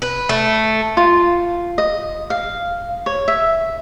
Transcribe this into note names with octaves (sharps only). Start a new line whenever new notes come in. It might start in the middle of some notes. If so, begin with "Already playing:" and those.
B4
A3
F4
D#5
F5
C#5
E5